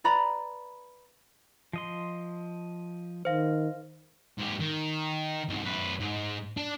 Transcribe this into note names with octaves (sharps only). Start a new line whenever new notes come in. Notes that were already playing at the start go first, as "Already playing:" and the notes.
B4 D5 A#5 B5
F3 D#5 C6
D#3 C5 F5
G#2 G4
D#3
C2 G#2
F#2 B4
G#2
D4